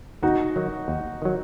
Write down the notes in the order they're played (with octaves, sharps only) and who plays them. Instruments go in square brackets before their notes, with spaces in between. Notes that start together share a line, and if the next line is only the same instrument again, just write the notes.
[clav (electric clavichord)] D#2 [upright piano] D#4 F#4
[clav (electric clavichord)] D#3 F#3
D#2
D#3 F#3